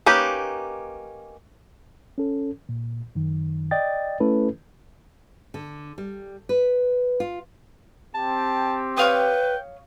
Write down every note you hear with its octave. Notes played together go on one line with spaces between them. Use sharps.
A#3 C#4 D#4 G4 B4
C#4 A4
A#2
F#2 D#3
D5 D#5 G5 A6
A3 C#4 E4 A4 B4
D3
G3
B4
F4
C4 G4 A5
B4 C#5 F5 G5 D#6